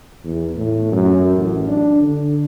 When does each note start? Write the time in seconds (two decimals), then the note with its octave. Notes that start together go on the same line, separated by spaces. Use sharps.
0.24 E2
0.56 A2
0.92 F#2
1.37 A1
1.68 D4
2.00 D3